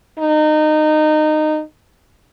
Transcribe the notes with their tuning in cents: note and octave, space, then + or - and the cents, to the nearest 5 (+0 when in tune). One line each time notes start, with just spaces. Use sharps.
D#4 -20